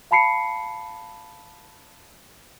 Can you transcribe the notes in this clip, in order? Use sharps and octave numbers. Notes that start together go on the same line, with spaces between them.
F5 A5 B5 C7 C#7